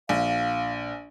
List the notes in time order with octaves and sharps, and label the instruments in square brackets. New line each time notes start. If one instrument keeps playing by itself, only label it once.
[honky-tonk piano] A#1 [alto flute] F5